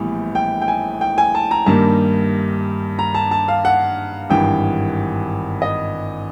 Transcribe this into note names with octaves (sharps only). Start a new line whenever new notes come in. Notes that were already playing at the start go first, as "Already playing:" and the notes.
Already playing: A#1 A2 E3 G3 B3
G5
G5
G#5
G5
G#5
A5
A#5
G2 D#3 G3 A#3 A5
A#5
A5
A5
F5
F#5
G#1 G2 E3 G5
D#5